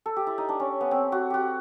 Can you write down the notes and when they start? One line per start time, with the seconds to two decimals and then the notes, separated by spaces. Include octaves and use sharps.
0.06 A4
0.16 G4
0.27 E4
0.38 D#4
0.49 D4
0.60 C#4
0.81 B3
0.91 C4
1.12 F#4
1.30 F#4 G4